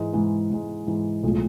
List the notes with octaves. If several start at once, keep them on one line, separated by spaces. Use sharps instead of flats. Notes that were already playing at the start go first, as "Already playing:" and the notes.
Already playing: G#2 E3 G#3
G#2 E3 G#3
G#2 E3 G#3
G#2 E3 G#3
B1 A2 F3 G#3